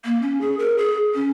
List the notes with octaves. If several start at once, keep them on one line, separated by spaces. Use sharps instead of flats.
A#3
C#4
G#4
A#4
G#4
C#4